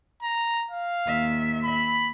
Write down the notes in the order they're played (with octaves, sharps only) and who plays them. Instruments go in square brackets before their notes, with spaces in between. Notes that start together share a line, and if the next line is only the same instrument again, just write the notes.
[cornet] A#5
F5
[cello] D#2 E5
[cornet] B5